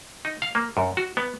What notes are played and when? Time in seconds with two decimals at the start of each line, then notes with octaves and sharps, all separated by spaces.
0.25 D#4
0.42 F5
0.55 A#3
0.77 F#2
0.97 F#4
1.17 B3